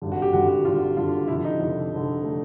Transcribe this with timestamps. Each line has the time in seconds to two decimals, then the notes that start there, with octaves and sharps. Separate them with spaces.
0.02 G#1 G2 D3
0.12 F#4
0.22 G4
0.32 G#1 G2 D3 F#4
0.48 F#4
0.64 G#1 G2 D3 F4
0.96 G#1 G2 D3 F4
1.28 F1 F2 D3 E4
1.44 D#4
1.59 F1 F2 D3
1.92 F1 F2 D3
2.23 D3 A3